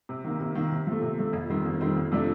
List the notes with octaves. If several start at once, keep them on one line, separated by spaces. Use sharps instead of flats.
C3
D#3 A#3
C3
D#3 A#3
C3
F3 A3
C3
F3 A3
F2
D#3 G3 C4
F2
D#3 G3 C4
F2
C3 F3 A3 D4